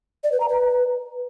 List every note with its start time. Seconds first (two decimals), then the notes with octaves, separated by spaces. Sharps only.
0.24 D5
0.32 B4
0.40 A#5
0.49 B4